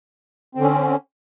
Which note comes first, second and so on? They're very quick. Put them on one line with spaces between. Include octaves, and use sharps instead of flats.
C4 D3 C#4